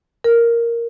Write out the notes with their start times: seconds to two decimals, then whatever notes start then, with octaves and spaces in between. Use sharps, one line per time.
0.24 A#4